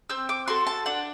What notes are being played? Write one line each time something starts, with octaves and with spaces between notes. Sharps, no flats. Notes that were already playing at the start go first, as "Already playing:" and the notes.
C4 E6
D6
F#4 A4 C6
A5
D4 F#5